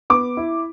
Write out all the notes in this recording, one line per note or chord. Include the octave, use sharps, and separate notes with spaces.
B3 D6
E4